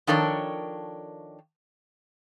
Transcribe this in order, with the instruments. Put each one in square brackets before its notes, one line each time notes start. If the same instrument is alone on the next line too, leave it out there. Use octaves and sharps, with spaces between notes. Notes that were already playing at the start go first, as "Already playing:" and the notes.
[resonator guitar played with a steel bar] D#3 F3 D4 A4 A#4 C#5